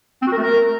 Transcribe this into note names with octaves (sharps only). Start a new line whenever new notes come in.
C4
F#4
A#4
A3
A#4